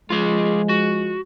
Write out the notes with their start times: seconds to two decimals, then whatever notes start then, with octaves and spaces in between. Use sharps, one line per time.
0.10 F3 G#3 F4 G#4
0.69 F#4